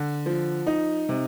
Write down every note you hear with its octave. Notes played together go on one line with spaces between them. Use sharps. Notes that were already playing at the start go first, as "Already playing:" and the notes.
Already playing: D3
F3
D#4
C3